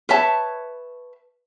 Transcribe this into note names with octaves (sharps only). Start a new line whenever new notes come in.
B4 C#5 E5 A5